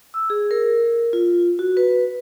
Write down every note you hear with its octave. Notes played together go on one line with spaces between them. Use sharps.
E6
G#4
A#4
F4
F#4
B4